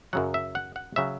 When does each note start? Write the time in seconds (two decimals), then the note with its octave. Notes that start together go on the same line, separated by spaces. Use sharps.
0.13 F#2 C#3 F#3 F#5
0.34 E5
0.55 F#5
0.76 F#5
0.96 C#3 F#3 E5